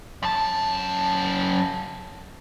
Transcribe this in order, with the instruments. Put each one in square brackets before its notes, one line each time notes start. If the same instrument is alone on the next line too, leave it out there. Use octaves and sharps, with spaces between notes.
[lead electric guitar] F#2 A5